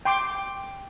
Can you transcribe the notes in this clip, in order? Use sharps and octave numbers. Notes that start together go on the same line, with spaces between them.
G5 C6 D6